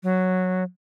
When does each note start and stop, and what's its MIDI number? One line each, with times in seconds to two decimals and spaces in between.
0.03 0.63 54